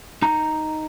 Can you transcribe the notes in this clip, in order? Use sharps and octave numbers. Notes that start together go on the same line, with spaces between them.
D#4 A#5